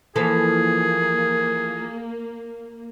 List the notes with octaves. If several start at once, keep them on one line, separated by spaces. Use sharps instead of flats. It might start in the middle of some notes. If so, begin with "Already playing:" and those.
E3 F3 A#3 G#4 A4